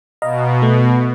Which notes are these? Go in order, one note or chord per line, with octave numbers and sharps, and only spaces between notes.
B2 D#5 F5 A#5
A3